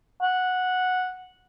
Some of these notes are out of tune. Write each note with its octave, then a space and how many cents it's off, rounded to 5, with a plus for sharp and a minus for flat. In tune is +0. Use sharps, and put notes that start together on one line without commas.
F#5 -10